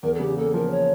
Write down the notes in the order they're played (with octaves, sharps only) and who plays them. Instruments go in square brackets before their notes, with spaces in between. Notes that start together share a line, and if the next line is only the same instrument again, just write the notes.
[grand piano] E2 [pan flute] A#4
[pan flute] A4
[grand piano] C#3 [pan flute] G4
[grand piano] A#3 [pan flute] A4
[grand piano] F3 [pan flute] A#4
[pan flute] C#5